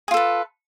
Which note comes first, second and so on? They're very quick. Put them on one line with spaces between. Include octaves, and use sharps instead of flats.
G#4 F4 A4 B4